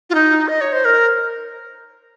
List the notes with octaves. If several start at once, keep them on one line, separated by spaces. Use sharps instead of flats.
F4
D#4
D#5
C#5
C5
A#4